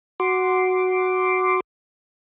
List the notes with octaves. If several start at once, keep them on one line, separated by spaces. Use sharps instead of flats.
F#4 C6 D6